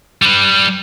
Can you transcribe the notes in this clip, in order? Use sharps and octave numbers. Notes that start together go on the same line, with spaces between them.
G3 B4